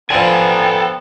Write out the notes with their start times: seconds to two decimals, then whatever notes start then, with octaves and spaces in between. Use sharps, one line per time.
0.10 D3 F3 B3 A4 G5 G#5